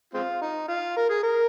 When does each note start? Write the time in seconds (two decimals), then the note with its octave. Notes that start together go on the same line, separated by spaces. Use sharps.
0.14 G#3 C4 F4
0.42 D#4
0.68 F4
0.96 A#4
1.10 G#4
1.23 A#4